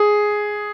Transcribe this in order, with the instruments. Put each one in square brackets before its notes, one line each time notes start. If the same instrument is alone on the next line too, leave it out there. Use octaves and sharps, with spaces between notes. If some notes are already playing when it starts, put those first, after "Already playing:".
Already playing: [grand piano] G#4